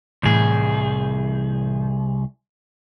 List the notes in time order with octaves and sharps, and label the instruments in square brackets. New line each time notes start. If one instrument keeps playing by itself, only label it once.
[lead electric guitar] C2 G#4 [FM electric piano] A2 E3 G6